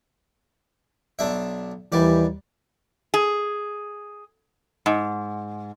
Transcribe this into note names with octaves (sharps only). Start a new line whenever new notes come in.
B1 D4 E5
D#2 E3 G3 D5
G#4
G#2